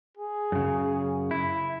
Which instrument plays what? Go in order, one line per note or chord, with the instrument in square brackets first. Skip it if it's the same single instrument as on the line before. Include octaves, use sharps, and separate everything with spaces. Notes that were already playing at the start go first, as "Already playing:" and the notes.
[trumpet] G#4
[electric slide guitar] F#2 C#3
E4